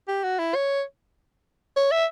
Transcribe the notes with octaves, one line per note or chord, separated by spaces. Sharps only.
G4
F#4
E4
C#5
C#5
E5